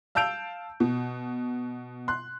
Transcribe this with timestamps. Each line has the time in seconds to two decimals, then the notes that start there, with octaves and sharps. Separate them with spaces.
0.15 F5 A5 E6 G6 D7 F7
0.80 B2
2.08 C6 F#6